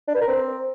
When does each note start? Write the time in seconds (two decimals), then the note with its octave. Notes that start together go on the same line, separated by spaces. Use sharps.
0.08 D4
0.14 B4
0.21 A#4
0.28 C4